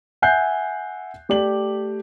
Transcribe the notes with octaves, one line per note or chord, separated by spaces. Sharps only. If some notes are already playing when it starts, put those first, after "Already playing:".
E5 F#5 G#5 F#6 G6 C7
A3 G4 D5 F#7